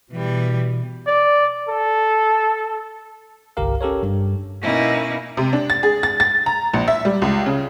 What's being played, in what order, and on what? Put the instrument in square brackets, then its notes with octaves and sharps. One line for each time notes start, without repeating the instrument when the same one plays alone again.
[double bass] B2 [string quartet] E3 G3
[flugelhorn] D5
A4
[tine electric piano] G1 C2 G4 A#4 F5
C#4 G4 A4 A#4 C#5
G2
[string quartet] B2 A#3 C#4 D#4 E4
[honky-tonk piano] C3
D4
A6
G#4
A6
A6
A#5
A#1
E5
G3
C#2
C#3